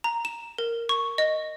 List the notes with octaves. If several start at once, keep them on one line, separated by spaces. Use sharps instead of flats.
A#5
E7
A#4
C#6
D#5